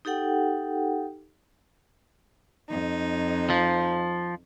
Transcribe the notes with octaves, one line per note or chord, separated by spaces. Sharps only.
D#4 G4 A4 F#5 G5
F2 D#4
F3